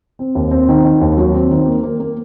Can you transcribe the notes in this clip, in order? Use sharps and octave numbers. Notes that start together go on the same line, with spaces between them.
C4
D#2
C4
D#3
D#3
D#2
F#3
C4
D#3
A#3
A#3
A#3